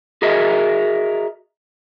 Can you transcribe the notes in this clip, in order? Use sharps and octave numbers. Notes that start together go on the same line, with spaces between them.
F#4 G#4 A#4 D#5 E5